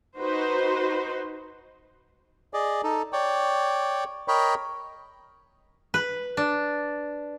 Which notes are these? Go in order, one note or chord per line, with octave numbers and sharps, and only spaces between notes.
D#4 F#4 B4 C5
G#4 D5 D#5
D#4 A4
C#5 D5 G5
A#4 C#5 D#5 G5 B5 C#6
B4
D4